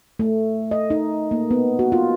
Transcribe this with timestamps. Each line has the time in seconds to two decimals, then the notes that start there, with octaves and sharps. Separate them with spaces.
0.19 A3
0.71 D#5
0.90 D#4
1.31 A#3
1.51 B3
1.79 F#4
1.92 F4